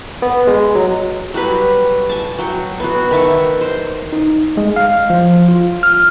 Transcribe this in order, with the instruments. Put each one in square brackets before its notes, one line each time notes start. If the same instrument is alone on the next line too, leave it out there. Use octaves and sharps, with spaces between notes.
[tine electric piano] B3
G#3
F#3
[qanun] F#3 G3 B4
G#5 A5
F#3 G5 C#6
B3 F#4
D#3 E5 A5 C#6
C5
[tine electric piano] D#4
G#3
F5
F3
F4
F6